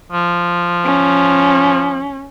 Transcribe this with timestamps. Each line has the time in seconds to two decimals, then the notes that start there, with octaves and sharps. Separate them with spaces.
0.12 F3
0.84 C#4